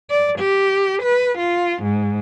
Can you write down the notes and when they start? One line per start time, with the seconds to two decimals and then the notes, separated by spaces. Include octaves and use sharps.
0.10 D5
0.39 G4
1.03 B4
1.38 F4
1.83 G#2